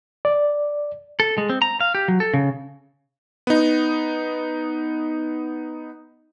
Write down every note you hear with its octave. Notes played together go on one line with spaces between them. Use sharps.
D5
A4
G#3
C4
A#5
F5
G4
F#3
A4
C#3
B3 D#4